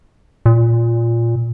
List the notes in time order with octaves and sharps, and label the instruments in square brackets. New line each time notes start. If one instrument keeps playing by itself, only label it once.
[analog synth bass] A#2